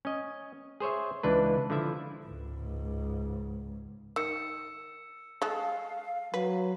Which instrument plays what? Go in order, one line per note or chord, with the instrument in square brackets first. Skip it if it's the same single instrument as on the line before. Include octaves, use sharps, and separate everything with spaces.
[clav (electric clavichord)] C#4 D#5
G#4 C5 C#5 E5
C#2 E3 D4 B4
D3 F3 E4 E5
[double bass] C#2 G#2
[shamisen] D#3 [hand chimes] E6 C#7
[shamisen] G#3 A4 [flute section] F5
[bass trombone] F#3 [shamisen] B4